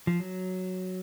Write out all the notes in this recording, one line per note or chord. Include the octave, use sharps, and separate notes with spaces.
F3
F#3